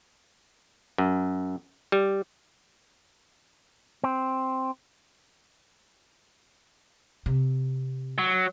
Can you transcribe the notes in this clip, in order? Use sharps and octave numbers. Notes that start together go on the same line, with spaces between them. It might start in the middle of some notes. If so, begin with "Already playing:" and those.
F#2
G3
C4
C3
F#3